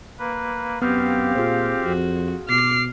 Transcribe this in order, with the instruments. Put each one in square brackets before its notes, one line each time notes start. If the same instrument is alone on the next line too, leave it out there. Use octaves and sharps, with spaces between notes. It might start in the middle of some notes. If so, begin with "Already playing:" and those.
[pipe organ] A#3 B4
[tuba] F#2 [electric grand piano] B3 F6 [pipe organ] C4 G4 F5
[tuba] A#2 [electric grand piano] F4 G#4 C5
[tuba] F2 [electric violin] F#4
[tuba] B2 [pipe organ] D6 [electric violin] F6 C7